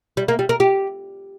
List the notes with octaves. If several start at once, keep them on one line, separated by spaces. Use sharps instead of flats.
G3
A#3
G3
A#4
G4